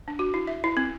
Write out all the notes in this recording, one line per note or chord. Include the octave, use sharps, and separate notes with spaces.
D4
F#4
E4
E5
E4
C4